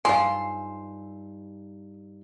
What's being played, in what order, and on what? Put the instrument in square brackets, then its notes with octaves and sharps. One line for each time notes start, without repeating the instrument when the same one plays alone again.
[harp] G2 D#4 E6 [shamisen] F3 F4 [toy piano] G#5 [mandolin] C6